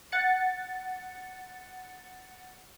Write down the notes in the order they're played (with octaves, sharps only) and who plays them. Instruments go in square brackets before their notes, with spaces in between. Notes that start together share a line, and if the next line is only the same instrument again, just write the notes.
[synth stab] F#5 A6 C#7